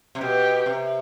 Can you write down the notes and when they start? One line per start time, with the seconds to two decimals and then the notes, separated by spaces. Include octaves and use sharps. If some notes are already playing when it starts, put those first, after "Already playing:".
0.15 C3
0.21 B2 G4
0.66 C3